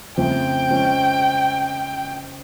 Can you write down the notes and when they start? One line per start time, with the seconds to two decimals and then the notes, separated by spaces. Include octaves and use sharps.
0.17 F2 C#3 F3 A3 C4 G5
0.70 C#3 F3 G#3 C#4